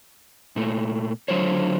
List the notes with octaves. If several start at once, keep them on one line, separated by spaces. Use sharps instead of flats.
A#2 A3
D3 F#3 F4 C5 C#5